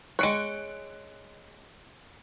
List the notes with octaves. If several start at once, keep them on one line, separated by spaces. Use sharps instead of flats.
G#3 C#5 F#6 C#7 D7